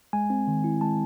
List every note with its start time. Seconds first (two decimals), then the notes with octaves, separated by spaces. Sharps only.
0.13 G#3 G#5
0.30 C4
0.47 D#3
0.64 E4
0.81 G#3 A5